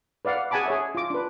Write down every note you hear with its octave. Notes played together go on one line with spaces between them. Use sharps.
B4 D5 F5 F#5
G#4 F#5 G#5 A5 B5 D6
G#4 C#5 E5
F4 D6
D4 B4